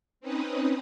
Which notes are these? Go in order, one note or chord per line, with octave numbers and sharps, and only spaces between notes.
C4 C#4 D#4 B4 D#5